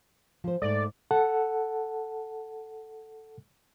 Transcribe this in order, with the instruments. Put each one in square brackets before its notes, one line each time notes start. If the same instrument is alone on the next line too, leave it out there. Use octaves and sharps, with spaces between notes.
[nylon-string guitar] F3 C5
[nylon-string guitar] G#2 A3 [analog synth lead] D5
[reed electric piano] A4 F#5 A5